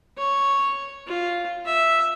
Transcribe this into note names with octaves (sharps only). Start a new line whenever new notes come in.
C#5
F4
E5